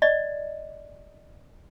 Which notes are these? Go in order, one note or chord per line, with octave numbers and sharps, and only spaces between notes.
D5 D#5